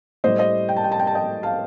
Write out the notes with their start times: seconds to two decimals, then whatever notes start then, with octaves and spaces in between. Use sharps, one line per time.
0.24 A2 G3 C5 D#5
0.39 C5 D#5
0.69 G5
0.76 A5
0.84 G5
0.92 A5
0.99 G5
1.07 A5
1.15 D#5 G5
1.43 F5 A5